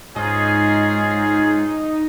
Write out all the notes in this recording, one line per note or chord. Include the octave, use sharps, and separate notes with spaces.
G#2 C#4 D#4 F4 G#4